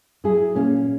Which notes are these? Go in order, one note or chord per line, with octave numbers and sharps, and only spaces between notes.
F#3 E4 G#4
A#2 A#3 C#4